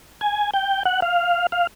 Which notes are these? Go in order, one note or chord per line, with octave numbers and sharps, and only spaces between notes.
G#5
G5
F#5
F5
F5